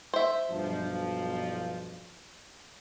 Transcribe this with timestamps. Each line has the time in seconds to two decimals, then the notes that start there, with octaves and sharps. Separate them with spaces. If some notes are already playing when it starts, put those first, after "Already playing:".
0.14 C5 E5
0.51 B1 G2 F3